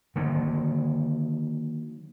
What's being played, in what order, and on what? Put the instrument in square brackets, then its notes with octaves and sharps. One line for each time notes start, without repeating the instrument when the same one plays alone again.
[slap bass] D3 D#3 F#3 A#3